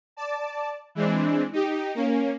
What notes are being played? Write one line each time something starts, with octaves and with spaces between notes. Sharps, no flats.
D5 A5
E3 G#3 C4 D4
D#4 G4
A#3 C#4